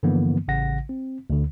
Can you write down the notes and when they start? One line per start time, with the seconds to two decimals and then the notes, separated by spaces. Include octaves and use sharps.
0.03 G2 D3 E3 F3 A#3 B3
0.48 A1 C#3 F#5 A#6
0.89 C4
1.30 D2 D3